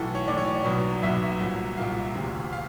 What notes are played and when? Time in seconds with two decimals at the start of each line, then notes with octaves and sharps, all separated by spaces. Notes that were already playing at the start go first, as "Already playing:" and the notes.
Already playing: B1 A2 E3 A4
0.15 C#5
0.27 B1 A2 E3 D5
0.38 C#5
0.47 D5
0.64 B1 B2 F#3
1.02 B1 B2 F#3 E5
1.40 C2 A#2 F#3
1.77 C2 A#2 F#3 F5
2.15 E1 D2 C3
2.53 F5